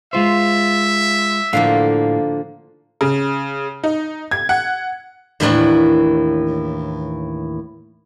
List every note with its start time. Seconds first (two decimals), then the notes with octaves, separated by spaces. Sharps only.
0.13 G#3 F4 C5 E5
1.53 A2 D3 F3 A#3 F5
3.01 C#3
3.84 D#4
4.31 G#6
4.49 F#5
5.40 D#2 A2 E3 A#3 C4 D4